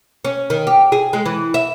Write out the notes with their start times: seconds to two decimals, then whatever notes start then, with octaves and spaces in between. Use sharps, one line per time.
0.25 C#4
0.50 D#3
0.67 G4
0.92 G#4
1.13 G#3
1.26 E3
1.54 E5